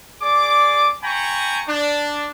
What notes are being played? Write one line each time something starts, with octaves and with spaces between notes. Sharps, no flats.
G#4 D5 D6
G5 G#5 A#5 B5 C#6
D4